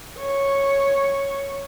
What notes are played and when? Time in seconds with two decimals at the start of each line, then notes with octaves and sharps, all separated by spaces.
0.19 C#5